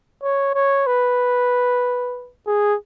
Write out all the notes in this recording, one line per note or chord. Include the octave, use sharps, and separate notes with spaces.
C#5
C#5
B4
G#4